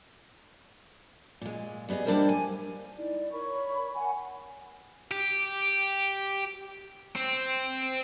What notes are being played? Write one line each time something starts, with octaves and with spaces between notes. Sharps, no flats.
A#2 G#3
G3 B3 G4 G#4 D#5
G3 A#3 D4 E4 A#4 C5
G#5
D#4 E4 D5
A#4 C#5 B5 C#6
F#5 G#5
G4
C4